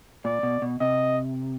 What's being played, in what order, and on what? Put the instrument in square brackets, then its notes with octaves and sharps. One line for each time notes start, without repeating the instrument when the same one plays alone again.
[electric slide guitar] A#2 [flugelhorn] D5
[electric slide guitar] B2
B2
[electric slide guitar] C3 [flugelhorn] D#5